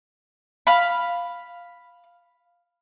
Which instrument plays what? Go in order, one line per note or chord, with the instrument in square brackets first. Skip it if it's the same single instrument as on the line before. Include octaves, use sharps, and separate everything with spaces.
[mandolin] F5 B5